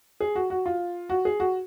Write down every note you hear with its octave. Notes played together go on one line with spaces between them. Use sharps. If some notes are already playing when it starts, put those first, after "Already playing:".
G#4
F#4
F#4
F4
F#4
G#4
F#4